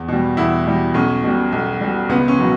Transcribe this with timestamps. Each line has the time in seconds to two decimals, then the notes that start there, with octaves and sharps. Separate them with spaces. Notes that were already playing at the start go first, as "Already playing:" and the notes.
Already playing: E2
0.08 B2 G3
0.37 E2 E4
0.66 B2 G3
0.94 B1 C#4
1.23 B2 G3
1.52 B1
1.81 B2 G3
2.09 C#2 B3
2.28 C#4
2.39 B2 F#3